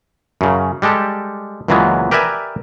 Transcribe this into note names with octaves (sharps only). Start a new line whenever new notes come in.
F#2 C#3
G3 G#3 G4 A4
C#2 A#2 E3 F#3 G#3 B3
G4 A#4 B4 D5 E5 G#5